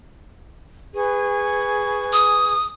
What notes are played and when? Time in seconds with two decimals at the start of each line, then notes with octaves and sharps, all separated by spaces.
0.94 G#4 B4 C#6
2.13 D#6